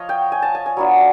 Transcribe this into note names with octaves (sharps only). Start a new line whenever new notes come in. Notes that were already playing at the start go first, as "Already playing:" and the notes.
Already playing: F3 C#5 D#5 F5
G5
G#5
A5
G#5
G#5
F#3 B3 D4 F4